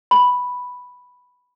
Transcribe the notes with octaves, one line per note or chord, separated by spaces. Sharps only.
B5